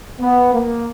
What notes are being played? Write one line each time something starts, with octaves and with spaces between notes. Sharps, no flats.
B3
A#3